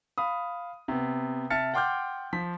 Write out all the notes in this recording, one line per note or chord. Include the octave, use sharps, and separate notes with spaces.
F5 B5 D#6
C3 B3
C3 E5 A5 F6 A6 C#7
F#5 G5 C6 D6 F6 G6
F3 B6